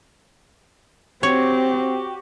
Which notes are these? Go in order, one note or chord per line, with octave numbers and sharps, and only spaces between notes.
C4 F#4 G4 C#5